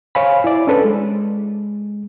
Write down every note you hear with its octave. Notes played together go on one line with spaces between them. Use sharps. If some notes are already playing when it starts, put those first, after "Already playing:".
C5 C#5 F5 G#5 B5
E4 D5
C#4 D4 A4 B4 C5
G#3